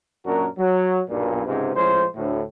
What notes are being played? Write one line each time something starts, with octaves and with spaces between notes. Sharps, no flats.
F#2 A#2 F#3 D4 F#4 A#4
F#3
B1 G2 A#2
C#2 G#2 C3
A2 F3 G#3 C#4 C5
D2 A2